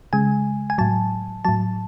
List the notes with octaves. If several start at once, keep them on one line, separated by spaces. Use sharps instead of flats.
C#3 G#3 G#5
G#5
A2 F#3 A5
A2 F#3 A5